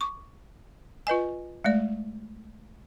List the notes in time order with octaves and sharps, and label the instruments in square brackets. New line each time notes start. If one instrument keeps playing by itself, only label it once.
[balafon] C#6 D6
F4 B4 D#5 G#5
G#3 A3 D5